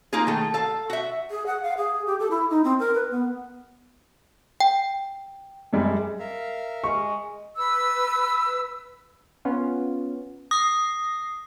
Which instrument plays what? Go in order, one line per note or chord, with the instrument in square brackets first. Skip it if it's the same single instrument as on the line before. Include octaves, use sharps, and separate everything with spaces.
[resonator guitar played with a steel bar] A#3 D#4 F4 G#4
D#3 A3
A4 F5
F#4 E5
[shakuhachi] G#4
F#5
F5
G#4
G4
A4
E4
D#4
C4
A#4
B4
B3
[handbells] G5
[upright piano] F#2 G3 G#3
[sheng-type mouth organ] A#4 E5 F5
[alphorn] G#3 [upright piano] C#6
[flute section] B4 E6
[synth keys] B3 C#4 F4
[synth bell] D#6 [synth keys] A#6 C7